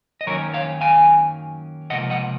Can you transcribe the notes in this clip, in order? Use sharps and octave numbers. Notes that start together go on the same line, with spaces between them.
D#5
F#2 D#3 F#3 A#3 C#4 A#4 C#5
C#5 F5
F5 G#5
C#2 C3 F3 A#3 D#5 F#5
D#5 F#5